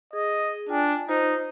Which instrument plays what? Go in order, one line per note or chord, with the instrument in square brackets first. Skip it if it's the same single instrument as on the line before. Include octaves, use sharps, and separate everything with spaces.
[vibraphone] G#4 [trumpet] D#5
[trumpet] D4 [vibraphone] F4 G5 G#5
[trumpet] D#4 [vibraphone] F4 C5 D#5